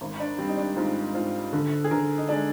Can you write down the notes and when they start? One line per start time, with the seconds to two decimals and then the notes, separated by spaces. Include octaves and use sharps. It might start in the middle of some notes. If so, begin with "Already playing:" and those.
0.01 G#1
0.20 D4
0.38 G3 C4
0.48 D#4
0.58 D4
0.76 G#2 F4
1.14 G#2 F4
1.53 D3
1.84 G#4
1.91 D3 A#4
2.18 D#4
2.29 G#3 D4